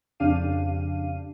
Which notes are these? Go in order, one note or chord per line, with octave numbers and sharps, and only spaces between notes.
F2 C#3 D4 G4 F5 D#7